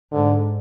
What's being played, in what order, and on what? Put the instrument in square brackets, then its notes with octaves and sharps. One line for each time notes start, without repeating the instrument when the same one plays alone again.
[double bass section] G#2 [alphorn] D3